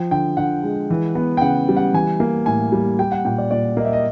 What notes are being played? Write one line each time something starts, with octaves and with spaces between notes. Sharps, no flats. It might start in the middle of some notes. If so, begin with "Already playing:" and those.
Already playing: F3 G5
D3 G5
D3 F#5
G#3
E3
B3
G5
C#3 F#5
G3
F#5
E3 G#5
A#3
A2 G#5
G3
G3 G5
F#5
A#2 G5
D5
A#2 D5
A#3 D#5
E5
D#5